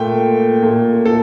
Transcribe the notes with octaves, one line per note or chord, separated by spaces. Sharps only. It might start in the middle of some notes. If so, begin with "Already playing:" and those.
Already playing: A#2 A3 G5
A#2 A3
A4